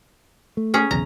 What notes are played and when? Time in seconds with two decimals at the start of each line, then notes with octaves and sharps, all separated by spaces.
0.57 A3
0.74 C#4 G#4 A#5
0.91 B1 E2 C#3 A#5